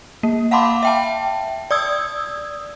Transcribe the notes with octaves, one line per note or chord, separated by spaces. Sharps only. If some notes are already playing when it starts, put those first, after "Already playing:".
A#3
F5 F#5 A5 B5 C6 D6
E5 G5 A5
D5 D#6 E6 G#6